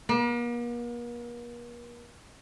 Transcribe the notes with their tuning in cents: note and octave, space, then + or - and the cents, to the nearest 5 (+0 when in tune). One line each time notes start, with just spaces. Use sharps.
A#3 +45